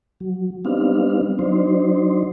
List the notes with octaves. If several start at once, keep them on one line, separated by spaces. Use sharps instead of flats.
F#3
G3 B3 C4 D4 D#4 F5
F#3 D4 D#4 C5